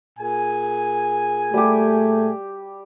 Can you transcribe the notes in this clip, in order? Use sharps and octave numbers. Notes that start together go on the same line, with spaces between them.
A#2 G#4 G#5
G3 A3 G4